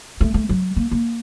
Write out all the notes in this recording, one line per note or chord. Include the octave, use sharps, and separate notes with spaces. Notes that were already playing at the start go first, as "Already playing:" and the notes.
A3
A3
F#3
A#3
A#3